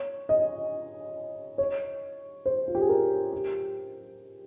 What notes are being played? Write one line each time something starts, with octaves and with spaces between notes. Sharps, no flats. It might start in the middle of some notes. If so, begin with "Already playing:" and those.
Already playing: C#5
D#5
C#5
C5
F4
G4
G#4
A#4
G4